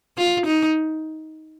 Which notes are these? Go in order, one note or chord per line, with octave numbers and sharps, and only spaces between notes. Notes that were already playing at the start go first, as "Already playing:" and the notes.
F4
D#4